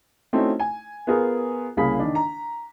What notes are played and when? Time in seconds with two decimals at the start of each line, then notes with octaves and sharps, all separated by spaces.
0.33 A3 C4 C#4 D#4 E4 F#4
0.60 G#5
1.07 B3 F4 G#4 A#4
1.77 C2 C#3 A#3 G#4 B5 B6
1.99 D#3 D4
2.15 A#5